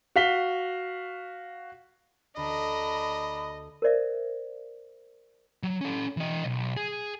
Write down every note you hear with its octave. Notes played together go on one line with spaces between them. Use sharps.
F#4 F5 B6 G7
D2 D4 D#5 A#5 B5
A#4 C5 D5 E5
F#3
C#4 A4
E3 D#5
B1
G#4